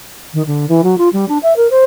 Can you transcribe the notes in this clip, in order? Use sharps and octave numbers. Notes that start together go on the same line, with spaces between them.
D#3
D3
E3
F#3
F4
G3
D4
E5
A#4
C5